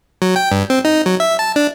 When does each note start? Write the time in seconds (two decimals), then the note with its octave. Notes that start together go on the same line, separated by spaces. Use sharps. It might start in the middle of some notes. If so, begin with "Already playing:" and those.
0.22 F#3
0.36 G5
0.52 G2
0.70 C4
0.85 D#4
1.06 F#3
1.20 E5
1.39 A5
1.56 D4